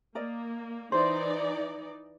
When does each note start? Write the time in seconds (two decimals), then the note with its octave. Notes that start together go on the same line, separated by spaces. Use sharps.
0.15 A#3 A#4 D5 D#5
0.92 E3 D#4 E4 C5 D5